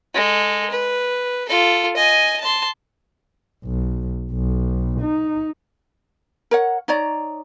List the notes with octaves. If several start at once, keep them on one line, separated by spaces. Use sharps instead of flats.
G#3 A4
B4
F4 A4
D#5 G#5
A5 C6
B1
B1
D#4
A#4 C#5 F#5
D#4 C#5 D5 A#5